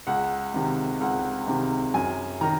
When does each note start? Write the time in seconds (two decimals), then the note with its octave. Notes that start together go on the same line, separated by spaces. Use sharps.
0.07 C#2 F#5
0.54 C3 D#3
1.00 C#2 F#5
1.47 C3 D#3
1.94 F#2 G#5
2.41 D#3 A#5